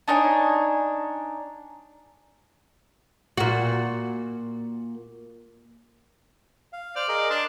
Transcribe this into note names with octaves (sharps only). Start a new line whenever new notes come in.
D4 D#4 C#5 G#5
A#2 F#4
F5
C5 D5 F6
G#4 A#4 D#5
D4 C6